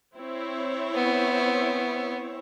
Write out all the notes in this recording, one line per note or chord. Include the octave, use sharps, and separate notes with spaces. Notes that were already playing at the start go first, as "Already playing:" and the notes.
C4 E4 C#5
B3